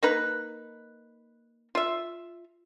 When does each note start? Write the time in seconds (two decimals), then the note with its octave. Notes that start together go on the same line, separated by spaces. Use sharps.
0.03 A#3 D#4 B4
1.75 F4 E5